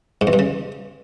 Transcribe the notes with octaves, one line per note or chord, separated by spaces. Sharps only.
G#2
E2
G2
C#3